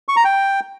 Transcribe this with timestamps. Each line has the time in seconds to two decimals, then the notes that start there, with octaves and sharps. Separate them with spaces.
0.08 C#6
0.16 A#5
0.24 G5